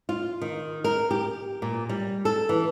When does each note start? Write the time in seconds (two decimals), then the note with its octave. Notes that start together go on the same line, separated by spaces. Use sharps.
0.09 F4
0.41 D#3
0.84 A#4
1.11 G4
1.62 A#2
1.89 G3
2.25 A4
2.49 E3